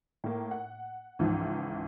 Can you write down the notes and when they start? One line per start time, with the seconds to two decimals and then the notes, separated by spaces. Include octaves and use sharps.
0.24 A2 A#3
0.51 F#5
1.19 C#2 G#2 E3 F3